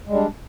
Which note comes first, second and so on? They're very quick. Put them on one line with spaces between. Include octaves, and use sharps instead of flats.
G#3 G3 D4